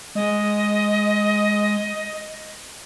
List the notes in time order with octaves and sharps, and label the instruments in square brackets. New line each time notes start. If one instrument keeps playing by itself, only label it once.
[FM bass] G#3 [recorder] D#5